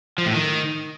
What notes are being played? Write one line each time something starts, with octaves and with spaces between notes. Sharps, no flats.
F3
A2
D#3